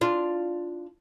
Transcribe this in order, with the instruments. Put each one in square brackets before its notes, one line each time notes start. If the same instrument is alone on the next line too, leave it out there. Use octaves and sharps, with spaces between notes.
[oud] D4 F4